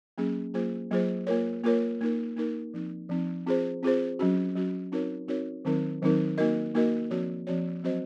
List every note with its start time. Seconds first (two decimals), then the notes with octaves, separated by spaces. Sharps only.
0.18 F#3 A#3 C#4 G#4
0.54 F#3 A#3 F4 G#4 C5
0.91 F#3 A#3 F4 G#4 C5
1.27 A#3 F4 A#4 C#5
1.64 A#3 F4 A#4 C#5
2.01 A#3 D#4 A#4
2.37 A#3 D#4 A#4
2.74 F3 C4 D#4
3.09 F3 C4 D#4
3.46 C4 F4 G#4 C5
3.83 C4 F4 G#4 C5
4.19 F#3 C#4 F#4
4.56 F#3 C#4 F#4
4.92 C4 D#4 F#4 A#4 C#5
5.28 C4 D#4 F#4 A#4 C#5
5.65 D#3 F#3 C4 D#4 A#4
6.02 D#3 F#3 C4 D#4 A#4
6.38 A#3 D#4 F#4 A#4 D#5
6.75 A#3 D#4 F#4 A#4 D#5
7.11 F3 C4 F#4 C#5
7.47 F3 C4 F#4 C#5
7.84 F#3 C4 F#4 C5 D#5